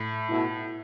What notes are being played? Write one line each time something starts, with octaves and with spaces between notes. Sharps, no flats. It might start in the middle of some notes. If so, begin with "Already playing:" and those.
Already playing: A2
B2 A3 E4